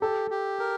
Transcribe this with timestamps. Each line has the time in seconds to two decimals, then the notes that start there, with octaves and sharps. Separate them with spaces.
0.01 G4 A4
0.31 G4
0.59 A#4